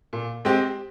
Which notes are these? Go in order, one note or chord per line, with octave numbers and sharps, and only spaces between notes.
A#2
G#3 C4 G4